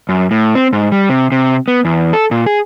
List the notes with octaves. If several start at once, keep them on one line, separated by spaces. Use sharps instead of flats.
F#2
A2
C4
G#2
G3
C3
C3
B3
E2
A4
A#2
G#4